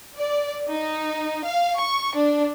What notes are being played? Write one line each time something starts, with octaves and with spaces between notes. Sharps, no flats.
D5
D#4
F5
C#6
D4